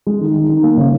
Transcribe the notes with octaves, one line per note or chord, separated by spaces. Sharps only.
G#3
D#3
D#3
D#3
A#3
C#3